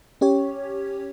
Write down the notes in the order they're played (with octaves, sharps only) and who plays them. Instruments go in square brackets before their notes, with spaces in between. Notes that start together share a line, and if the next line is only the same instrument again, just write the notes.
[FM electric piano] C#4 G4 C#5